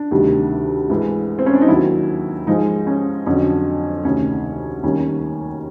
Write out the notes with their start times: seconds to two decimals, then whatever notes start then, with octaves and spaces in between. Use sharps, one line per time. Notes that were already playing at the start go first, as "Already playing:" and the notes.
Already playing: D4
0.11 D2 C3 D#3 G3
0.90 G#2 E3 G#3
1.39 C4
1.46 C#4
1.54 D4
1.61 D#4
1.68 D#2 D#3 F#3 E4
2.47 G#2 F3 G#3 D#4
2.87 C#4
3.26 F2 D3 F#3 C#4
4.05 D2 C3 D#3 C#4
4.83 D#2 D#3 G3 C#4